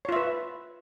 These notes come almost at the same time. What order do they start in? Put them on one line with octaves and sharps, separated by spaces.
C#5 F4 E5 B4